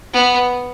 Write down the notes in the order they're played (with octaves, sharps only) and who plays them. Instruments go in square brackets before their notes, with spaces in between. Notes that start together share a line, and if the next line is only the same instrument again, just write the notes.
[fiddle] B3